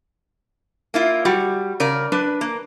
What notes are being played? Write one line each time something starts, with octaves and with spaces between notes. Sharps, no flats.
A#3 E4 F4
G3 F#4
C#3 A#4 D5
D4 B4
A#3